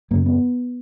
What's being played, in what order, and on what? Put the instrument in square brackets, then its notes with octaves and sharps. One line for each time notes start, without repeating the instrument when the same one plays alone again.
[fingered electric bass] F#2 C#3 A#3
B3